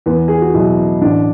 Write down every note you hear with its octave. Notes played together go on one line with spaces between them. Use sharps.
E2 B3
G#4
F#4
B2 F#3 E4
A1 D4